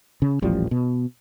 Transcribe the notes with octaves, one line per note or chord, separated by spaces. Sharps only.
C#3
D#1 A1 F3 G3
B2